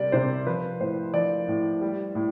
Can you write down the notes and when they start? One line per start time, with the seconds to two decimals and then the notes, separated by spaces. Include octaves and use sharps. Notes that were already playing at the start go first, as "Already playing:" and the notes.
Already playing: C3 G3 D5
0.12 C3 C5
0.47 F3 B4
0.80 A2 C5
1.14 F3 D5
1.48 A2
1.82 G3
2.15 A2